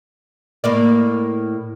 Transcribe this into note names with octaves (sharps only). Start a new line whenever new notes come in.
A2 A#3 D5